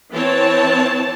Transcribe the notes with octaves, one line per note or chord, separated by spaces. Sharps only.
E3 C4 C#5 A5